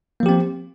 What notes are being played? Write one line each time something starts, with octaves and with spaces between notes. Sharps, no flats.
F3 A#3 C4 G4